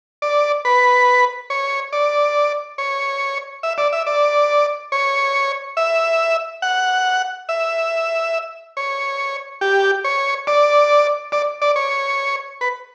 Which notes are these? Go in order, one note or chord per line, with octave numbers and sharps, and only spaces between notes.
D5
B4
C#5
D5
C#5
E5
D5
E5
D5
C#5
E5
F#5
E5
C#5
G4
C#5
D5
D5
D5
C#5
B4